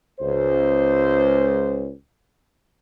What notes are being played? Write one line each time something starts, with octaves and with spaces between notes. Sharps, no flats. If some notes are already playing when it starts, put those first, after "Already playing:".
C#2 C5